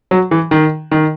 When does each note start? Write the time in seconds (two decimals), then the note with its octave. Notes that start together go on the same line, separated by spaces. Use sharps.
0.11 F#3
0.31 E3
0.51 D#3
0.91 D#3